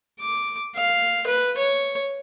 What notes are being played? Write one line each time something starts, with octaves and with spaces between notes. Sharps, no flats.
D6
F5
B4
C#5